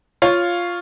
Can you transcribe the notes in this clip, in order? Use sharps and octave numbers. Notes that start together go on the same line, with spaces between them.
F4 C#5 F5